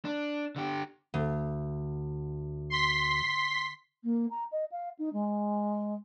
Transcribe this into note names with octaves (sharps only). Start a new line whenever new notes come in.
D4
D3 G4
D2
C6 B6
A#3
A#5
D#5
F5
D#4
G#3